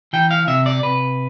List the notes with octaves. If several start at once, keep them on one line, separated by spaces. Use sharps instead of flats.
E3 G5
F5
C3 E5
D5
C3 B4